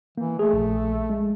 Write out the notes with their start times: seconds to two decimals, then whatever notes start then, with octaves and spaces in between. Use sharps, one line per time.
0.18 E3 A#3
0.39 A3 G#4
0.53 A#1
1.10 G#3